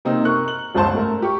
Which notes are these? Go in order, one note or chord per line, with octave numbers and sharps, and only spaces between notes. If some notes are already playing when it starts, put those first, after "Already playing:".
C3 A#3 C4 D#4
A#4 C#6 F#6
F#7
G1 C#2 G#2 C5 A5 C6
A3 A#4
G4 C#6